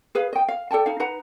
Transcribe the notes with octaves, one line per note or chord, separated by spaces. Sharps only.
G#4 B4 F5
D#5 G5
F5
A4 D5 G5 A5
D#4 F5
D#4 B4 F#5 A#5